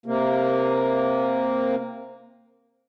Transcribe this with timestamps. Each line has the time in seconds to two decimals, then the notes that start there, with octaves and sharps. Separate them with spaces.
0.06 C3 A#3